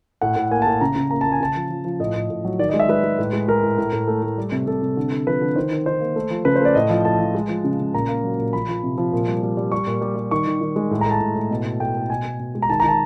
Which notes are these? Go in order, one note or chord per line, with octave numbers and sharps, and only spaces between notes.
A2 F#5
A2
A#3 G#5
A5
A2
C#3 A#5
C#3
A#3 A#5
A#3 A5
G#5
C#3 A5
F3
F3
F3
A2 D#5
A2
A2
F#3
D#3 D5
D#5
G#3
E5
G#3 B4
G#3
A2
G#3
G#3 A#4
A2
A2
A2
A3
A3
G3
C3
C3 A4
C3
D3
D3
F3 B4
D3
D#3 C5
D#3
D#3 C5
A#3
A3
F3
C#3 B4
C5
A3 D5
A2 D#5
F3
A2 A5
F3
G#3
F3
C#3
C#3
A#2 A#5
A#3
F#3
A#2
F3 B5
F3
C3
F3
A#2
G3
G3
G3
G3 C#6
A#2
G3
G3
D#3 C#6
D#3
D#3
G#3
A2
A#5
A3
A5
A2
A2
B2
B2
A3 G5
A3
B2 G#5
B2
B2
G#3
A#5
D#3 A5
A#5
D#3 A5